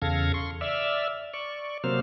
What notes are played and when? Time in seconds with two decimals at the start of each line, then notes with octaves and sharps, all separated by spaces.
0.02 E2 C#3 A4 F5 G#6 A#6
0.34 C6 C#6
0.61 D5 E5 E6 F6
1.34 D5 C#6
1.84 C3 F#3 A#3 C4 C5 F6